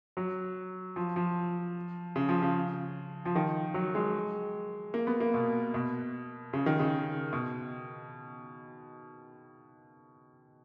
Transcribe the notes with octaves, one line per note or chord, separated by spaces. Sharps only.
F#3
F3
F3
C#3
F3
C#3
F3
D#3
F#3
G#3
A#3
B3
A#3
B2
B2
C#3
D#3
C#3
B2